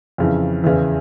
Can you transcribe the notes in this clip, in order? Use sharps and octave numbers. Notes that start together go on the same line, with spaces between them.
F2 C#3 E3
E2 C#3 E3